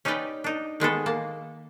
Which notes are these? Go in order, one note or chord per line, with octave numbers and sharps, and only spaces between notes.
C#4 D#4 G4 B4 D5 G5
D4 D#4
D#3 G#3 B3 A4
A#3 A5